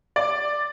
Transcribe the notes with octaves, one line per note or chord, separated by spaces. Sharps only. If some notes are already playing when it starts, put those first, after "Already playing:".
D5